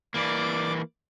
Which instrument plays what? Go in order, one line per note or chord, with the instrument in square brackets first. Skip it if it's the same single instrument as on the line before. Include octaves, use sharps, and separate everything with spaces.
[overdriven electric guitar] E3 A#3 [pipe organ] D5 D6